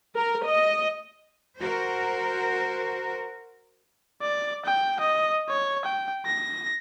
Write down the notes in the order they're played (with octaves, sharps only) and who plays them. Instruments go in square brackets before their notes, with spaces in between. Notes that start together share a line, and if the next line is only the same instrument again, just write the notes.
[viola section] A#4
D#5
[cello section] F#4 A#4 C5
[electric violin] D5
G5
D#5
C#5
G5
A#6